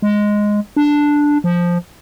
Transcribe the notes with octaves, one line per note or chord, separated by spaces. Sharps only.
G#3
D4
F3